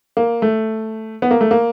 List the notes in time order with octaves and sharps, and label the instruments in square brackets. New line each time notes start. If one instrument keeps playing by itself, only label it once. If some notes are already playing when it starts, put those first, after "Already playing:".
[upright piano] A#3
A3
B3
A#3
A3
A#3